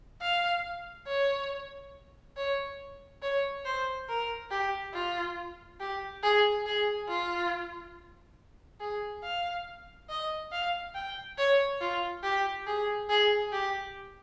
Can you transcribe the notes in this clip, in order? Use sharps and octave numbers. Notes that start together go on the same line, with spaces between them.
F5
C#5
C#5
C#5
C5
A#4
G4
F4
G4
G#4
G#4
F4
G#4
F5
D#5
F5
G5
C#5
F4
G4
G#4
G#4
G4